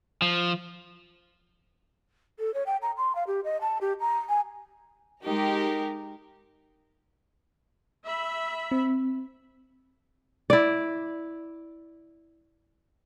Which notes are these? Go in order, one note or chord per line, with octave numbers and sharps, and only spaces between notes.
F3
A4
C#5
G5
A#5
C6
F5
G4
D#5
A5
G4
A#5
G#5
G#3 D#4 G4 A#4
E5 B5
C4
E4 D5